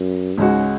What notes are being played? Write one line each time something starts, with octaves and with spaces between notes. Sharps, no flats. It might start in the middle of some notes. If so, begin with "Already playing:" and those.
Already playing: F#2
C#2 G#2 C#3 G#3 F#4